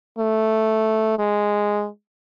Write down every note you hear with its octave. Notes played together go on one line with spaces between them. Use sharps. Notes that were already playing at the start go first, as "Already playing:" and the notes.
A3
G#3